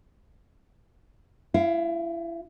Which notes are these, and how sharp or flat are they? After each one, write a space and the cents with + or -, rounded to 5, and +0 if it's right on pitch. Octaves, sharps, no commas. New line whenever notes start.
E4 +30 F5 +0